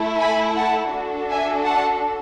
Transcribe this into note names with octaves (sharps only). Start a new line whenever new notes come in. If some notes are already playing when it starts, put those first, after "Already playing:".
Already playing: A3 E4 A4
G#5 B5
F#5 A5
D4 F#4 A4
E5 G#5
F#5 A5